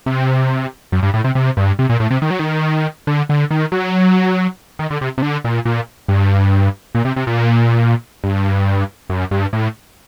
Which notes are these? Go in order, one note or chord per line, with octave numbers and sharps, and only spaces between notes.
C3
F#2
G2
A2
C3
C3
G2
C3
A#2
A2
C3
D#3
F#3
D#3
D3
D3
D#3
F#3
D#3
D3
C3
C3
D3
A#2
A#2
G2
A#2
C3
C3
A#2
G2
F#2
G2
A2